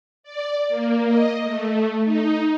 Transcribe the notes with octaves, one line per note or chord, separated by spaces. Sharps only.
D5
A#3
D#5
A3
D#4